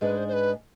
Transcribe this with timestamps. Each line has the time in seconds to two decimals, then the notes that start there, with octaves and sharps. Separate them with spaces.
0.01 G#2 G#3 D4 G#4 B4
0.17 C5
0.28 C5
0.33 B4